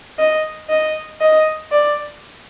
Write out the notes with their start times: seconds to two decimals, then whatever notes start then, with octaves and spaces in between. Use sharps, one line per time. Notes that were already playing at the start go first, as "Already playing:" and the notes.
0.19 D#5
0.69 D#5
1.21 D#5
1.72 D5